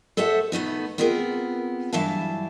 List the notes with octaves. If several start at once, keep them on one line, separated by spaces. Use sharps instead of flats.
A4 C5 C#5 E5 F#5
B2 A3 B3 D#4
B3 C4 F4 G#4 A#4
G2 E3 F#3 E4 F5 A5